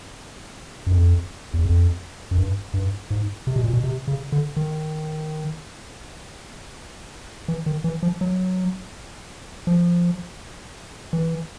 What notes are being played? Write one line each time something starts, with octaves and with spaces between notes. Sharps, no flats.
F#2
F2
E2
F2
F#2
G2
G2
G#2
C3
B2
A#2
B2
C3
C#3
D3
D#3
E3
D#3
E3
F3
F#3
F3
E3